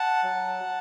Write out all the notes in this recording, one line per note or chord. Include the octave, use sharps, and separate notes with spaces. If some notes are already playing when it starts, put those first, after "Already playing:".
Already playing: F#5 A5
F#3